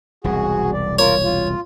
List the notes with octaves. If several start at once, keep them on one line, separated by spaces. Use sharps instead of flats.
E1 C2 F#4 G#4
D5
F4 A#4 C#5
F4